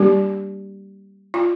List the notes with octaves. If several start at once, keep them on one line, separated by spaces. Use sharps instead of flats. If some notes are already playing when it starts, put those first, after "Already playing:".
Already playing: G3 A#3 D4 G4
F4